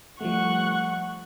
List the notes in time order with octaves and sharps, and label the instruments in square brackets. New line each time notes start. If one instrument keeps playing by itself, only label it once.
[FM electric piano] F3 G3 A3 [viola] F#5 C#6